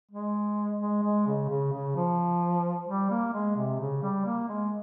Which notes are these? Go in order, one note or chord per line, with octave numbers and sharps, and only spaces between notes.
G#3
G#3
G#3
C#3
C#3
C#3
F3
G3
A#3
G#3
C3
C#3
G3
A#3
G#3